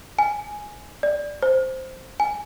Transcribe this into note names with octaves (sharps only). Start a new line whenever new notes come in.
G#5
D5
C5
G#5